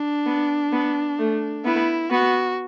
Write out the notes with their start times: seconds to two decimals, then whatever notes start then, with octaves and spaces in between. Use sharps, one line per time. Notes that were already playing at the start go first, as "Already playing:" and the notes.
Already playing: D4
0.26 B3
0.72 B3
1.19 A3
1.65 B3 E4
2.11 B3 F#4